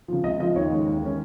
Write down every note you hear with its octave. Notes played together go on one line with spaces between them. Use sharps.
C#3 F3
C#2 D#5
C#3 F3 D#5
D#2 C#5
D#3 G#3 C#4
D#2
D#3 G#3 C#4